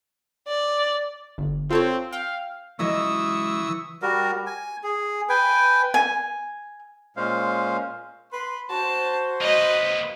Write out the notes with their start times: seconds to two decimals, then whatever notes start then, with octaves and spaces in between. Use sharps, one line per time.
0.48 D5
1.38 G1
1.70 C4 F4 A4 C#5
2.13 F5 G5
2.79 C#2 E3 F#3 D#5 C#6 D#6 E6
4.02 G3 F#4 A#4
4.46 G#5
4.83 G#4
5.29 B4 G5 G#5
5.94 G#5
7.17 A#2 G#3 C#4 C5 F5
8.32 B4 C6
8.70 F#4 C5 A5
9.41 A#3 B4 D#5